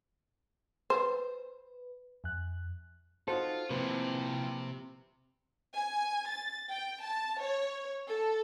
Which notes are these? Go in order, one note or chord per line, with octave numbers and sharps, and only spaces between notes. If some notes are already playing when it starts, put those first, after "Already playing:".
B4 C5
F2 F#6
D#4 F4 F#4 A4 C5
C3 F3 A#3 C4 E4 B4
G#5
A6
G5
A5
C#5
A4